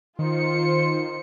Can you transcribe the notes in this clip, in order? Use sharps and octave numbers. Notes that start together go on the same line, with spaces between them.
D#3 F4 C5 C#7